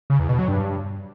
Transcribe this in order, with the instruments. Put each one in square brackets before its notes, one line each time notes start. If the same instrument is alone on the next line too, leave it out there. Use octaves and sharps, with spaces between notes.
[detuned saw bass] C#3
E2
B2
F#3
G2